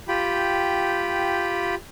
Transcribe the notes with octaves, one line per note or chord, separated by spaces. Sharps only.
F4 G4 G5 B5